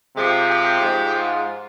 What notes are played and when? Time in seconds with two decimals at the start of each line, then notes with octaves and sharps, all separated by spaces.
0.16 C3 F3 G#3 G4
0.50 G4
0.82 G#2 F3 G#3
1.14 F4